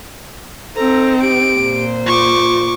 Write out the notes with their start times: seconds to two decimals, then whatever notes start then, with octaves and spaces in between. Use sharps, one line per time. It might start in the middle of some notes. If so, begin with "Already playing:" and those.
0.76 C4 D#4 A4 A#5
1.22 G4 D7
1.57 A#2 C5
2.06 F4 C#6 D6